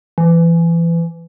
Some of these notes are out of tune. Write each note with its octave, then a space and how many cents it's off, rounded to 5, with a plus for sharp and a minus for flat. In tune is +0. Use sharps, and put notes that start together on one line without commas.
E3 +25